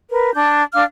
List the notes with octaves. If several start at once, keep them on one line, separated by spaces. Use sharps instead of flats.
A#4 B4
D4 A5 G6
D4 F5 D6 F6